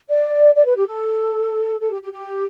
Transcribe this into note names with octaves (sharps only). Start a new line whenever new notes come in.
D5
D5
B4
G4
A4
A4
G4
G4
G4